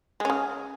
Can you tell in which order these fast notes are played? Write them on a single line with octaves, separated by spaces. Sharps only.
G#3 C#4 C#3